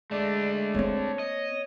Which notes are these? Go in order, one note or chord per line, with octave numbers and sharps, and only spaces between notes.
G#3 A3 D4 D5
A#3 C4 C#5
D#5